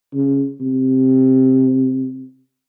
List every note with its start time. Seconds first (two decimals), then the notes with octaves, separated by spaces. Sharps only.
0.14 C#3
0.61 C3